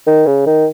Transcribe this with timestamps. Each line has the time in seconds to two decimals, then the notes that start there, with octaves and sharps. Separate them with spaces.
0.07 D#3
0.27 C#3
0.46 D#3